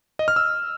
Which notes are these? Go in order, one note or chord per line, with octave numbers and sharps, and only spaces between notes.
D#5
F6
E6